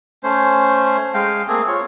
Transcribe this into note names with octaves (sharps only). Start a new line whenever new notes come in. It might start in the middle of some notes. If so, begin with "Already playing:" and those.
A3 C#4 C5
G#3 F5 G5
A3 A#3 C4 G#4
F4 C#5